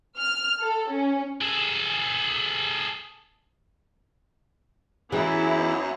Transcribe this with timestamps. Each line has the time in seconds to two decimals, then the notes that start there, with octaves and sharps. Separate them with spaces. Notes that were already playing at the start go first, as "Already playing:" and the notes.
0.17 F6
0.60 A4
0.90 C#4
1.41 G#4 A4
5.12 F#2 E3 B3 E4 G#4